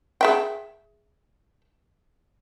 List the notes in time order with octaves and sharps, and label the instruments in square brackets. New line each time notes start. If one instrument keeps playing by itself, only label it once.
[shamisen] G#4 E5 G5